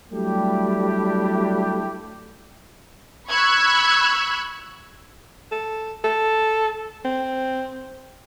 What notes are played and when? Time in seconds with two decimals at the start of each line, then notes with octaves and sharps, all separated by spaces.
0.11 F#3 G3 A3 D4 E4 G4
3.31 B5 C#6 E6 F#6 G#6
5.52 A4
6.04 A4
7.05 C4